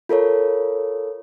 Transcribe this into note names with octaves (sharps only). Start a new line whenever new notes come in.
F4 A4 A#4 C#5